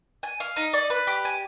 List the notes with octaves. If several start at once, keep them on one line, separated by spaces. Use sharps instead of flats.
G#5
F5
D#4
D5
B4
G4
G#5